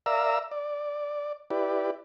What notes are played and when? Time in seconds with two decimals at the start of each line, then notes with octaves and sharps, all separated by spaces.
0.06 A#4 D5 E5 F5 A#5 E6
0.51 D5
1.50 E4 G4 B4 D5